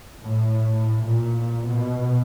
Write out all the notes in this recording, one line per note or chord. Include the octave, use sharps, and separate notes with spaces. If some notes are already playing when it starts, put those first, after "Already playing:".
A2
A#2
B2